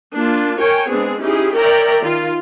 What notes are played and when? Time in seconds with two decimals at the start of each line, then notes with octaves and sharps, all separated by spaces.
0.14 A#3 D4 F4
0.60 A#4 C#5 G5 G#5
0.90 G#3 B3 C4 D4 G#4
1.20 C#4 D#4 E4 G4 G#4
1.56 A#4 C#5 D5 E5 G5 A#5
2.03 D#3 F4